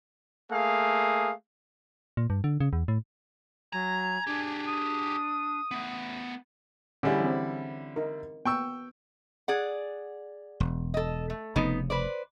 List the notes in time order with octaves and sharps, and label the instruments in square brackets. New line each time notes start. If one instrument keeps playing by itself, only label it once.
[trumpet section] A3 A#3 G#4 F5
[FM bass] A#2
G2
D3
C#3
E2
A2
[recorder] F#3 [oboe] G#5 [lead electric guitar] A#5
[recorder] D4 [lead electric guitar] G4 G#4
[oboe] D#6
[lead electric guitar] A3 B3
[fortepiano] D3 G3 E4 [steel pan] C#4 G#4
[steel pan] E3 C4
D#4 A#4
[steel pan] B3 [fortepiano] G5 C#6 E6
[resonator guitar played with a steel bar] G#4 D5 F#5
[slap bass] E1
[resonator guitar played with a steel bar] A4 D#5
A3
[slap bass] F1 F2 C#3 [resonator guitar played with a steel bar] B3 D#4
[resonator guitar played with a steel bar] B4 C5 D5